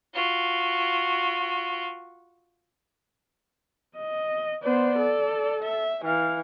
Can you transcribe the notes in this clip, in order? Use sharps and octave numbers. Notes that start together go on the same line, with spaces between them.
F4 F#4
D#5
B3 C5 D5
A4
E5
E3 F5